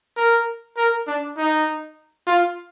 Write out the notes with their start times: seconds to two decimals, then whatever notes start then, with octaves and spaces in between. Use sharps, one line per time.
0.17 A#4
0.77 A#4
1.07 D4
1.38 D#4
2.27 F4